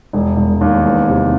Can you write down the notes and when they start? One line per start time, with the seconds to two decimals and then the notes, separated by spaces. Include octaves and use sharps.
0.13 E1
0.37 E1
0.61 D#2
0.85 E2
1.09 C3